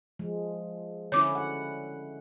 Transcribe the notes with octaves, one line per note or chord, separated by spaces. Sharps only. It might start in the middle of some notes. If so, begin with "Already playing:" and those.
F3 G#3
D3 C#4 E4 C#5 D6
F#5